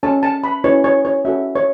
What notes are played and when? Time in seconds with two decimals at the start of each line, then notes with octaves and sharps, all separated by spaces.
0.03 C#4 A4 C#5 A5
0.23 A5
0.44 B5
0.64 C#4 E4 B4 C#5
0.84 C#5
1.05 C#5
1.25 C#4 F#4 A4 C#5 E5
1.56 C#5